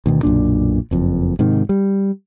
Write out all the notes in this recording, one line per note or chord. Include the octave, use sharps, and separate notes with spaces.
D2 B2 D#3
B1 F#2 A#2 D4
F#1 F2
G#2 C3 D#3
G3